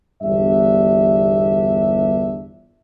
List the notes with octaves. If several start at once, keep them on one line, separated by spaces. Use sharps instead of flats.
G1 E2 G2 D4 E5